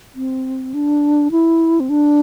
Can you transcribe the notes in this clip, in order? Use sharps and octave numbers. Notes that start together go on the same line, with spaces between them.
C4
D4
E4
C4
D4